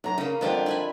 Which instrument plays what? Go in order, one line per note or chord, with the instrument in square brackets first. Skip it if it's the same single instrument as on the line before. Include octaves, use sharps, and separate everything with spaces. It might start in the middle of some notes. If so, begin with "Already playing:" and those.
[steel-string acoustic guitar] F#2 A#5
[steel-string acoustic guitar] C#3 [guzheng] A#3 C#4
[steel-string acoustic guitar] F2 D4 F4 [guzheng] D3 F3 G3
[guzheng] E4 G#5 B5